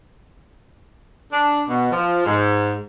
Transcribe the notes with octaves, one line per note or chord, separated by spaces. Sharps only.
D4
B2
F3
G#2